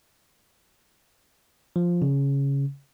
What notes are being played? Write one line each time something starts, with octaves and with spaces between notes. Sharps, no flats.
F3
C#3